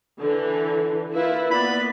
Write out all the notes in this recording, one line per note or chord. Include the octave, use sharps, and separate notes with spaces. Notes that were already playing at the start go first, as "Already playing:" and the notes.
D3 E3
A#3 E4 F4 B4 F5
A#3 B3 D5 B5